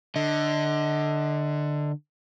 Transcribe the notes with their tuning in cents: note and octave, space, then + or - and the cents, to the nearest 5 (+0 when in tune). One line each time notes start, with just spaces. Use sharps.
D3 +15 D#5 +30